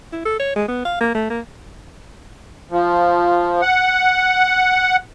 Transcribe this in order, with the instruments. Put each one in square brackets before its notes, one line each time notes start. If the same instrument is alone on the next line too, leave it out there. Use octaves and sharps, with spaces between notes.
[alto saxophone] E4
A4
C#5
G#3
B3
F5
A#3
A3
A#3
[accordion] F3
F#5